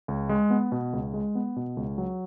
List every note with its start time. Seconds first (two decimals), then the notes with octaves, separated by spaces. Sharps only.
0.08 C#2
0.29 G#3
0.50 B3
0.72 B2
0.93 C#2
1.14 G#3
1.35 B3
1.56 B2
1.77 C#2
1.98 F#3